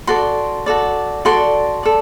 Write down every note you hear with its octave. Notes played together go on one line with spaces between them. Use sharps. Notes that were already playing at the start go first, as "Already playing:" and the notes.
F#4 A4 D5 C6
F#4 A4 D5
F#4 A4 D5 C6
A4 D5